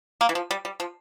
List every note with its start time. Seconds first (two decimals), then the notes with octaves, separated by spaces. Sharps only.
0.21 A#3
0.29 E3
0.35 F3
0.51 G3
0.65 G3
0.80 F3